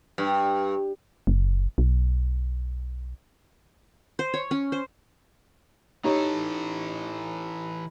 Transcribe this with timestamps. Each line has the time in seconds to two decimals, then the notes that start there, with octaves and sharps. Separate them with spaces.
0.18 G2
1.27 F#1
1.78 B1
4.19 C5
4.34 C#5
4.51 C#4
4.72 C5
6.04 E3 D#4 G4 A4 C#5